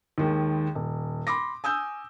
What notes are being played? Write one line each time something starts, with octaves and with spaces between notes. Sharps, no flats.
D#2 D#3 G#3
D#1
B5 C6 D6 A#6
G#5 D#6 E6 G6